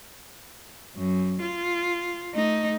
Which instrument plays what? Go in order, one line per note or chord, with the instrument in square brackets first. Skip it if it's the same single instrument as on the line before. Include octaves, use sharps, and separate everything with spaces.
[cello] F#2
F4
A3 D#4